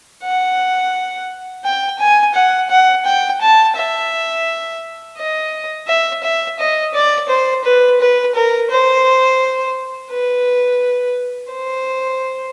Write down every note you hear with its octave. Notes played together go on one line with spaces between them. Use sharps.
F#5
G5
G#5
F#5
F#5
G5
A5
E5
D#5
E5
E5
D#5
D5
C5
B4
B4
A#4
C5
B4
C5